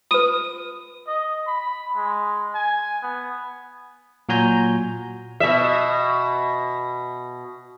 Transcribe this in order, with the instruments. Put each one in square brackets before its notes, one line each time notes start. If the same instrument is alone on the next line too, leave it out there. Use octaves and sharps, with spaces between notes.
[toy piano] F4 B4 [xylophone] D#6 D#7
[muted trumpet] D#5
B5
G#3
G#5
B3
[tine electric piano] A#2 F#3 F#4 G#5 A#5 G6
[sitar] B2 E5